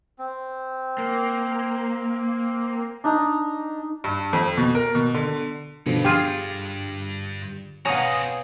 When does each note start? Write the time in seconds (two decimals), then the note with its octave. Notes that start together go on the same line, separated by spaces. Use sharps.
0.19 C4
0.98 A#3
3.04 D4 D#4 A#5
4.04 G2
4.33 F2
4.57 B2
4.75 A#4
4.95 B2
5.14 D3
5.87 G2 B2 D3 F3
6.05 F4 G4 G#4
7.85 B2 C4 F#4 C#5 F5 G#5 A#5 D#6